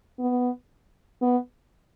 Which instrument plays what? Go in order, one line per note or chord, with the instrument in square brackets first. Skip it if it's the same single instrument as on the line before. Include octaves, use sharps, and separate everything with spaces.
[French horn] B3
B3